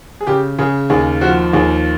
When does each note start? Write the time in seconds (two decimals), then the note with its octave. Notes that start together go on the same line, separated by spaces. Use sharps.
0.21 G#4
0.27 C#3 G4
0.59 C#3 G#4
0.90 D#2 G#4
1.21 F3 F#4
1.53 D#2 G#4